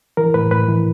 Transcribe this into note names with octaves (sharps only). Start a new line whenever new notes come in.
E3 A#4
A2 B4
A2 B4
E3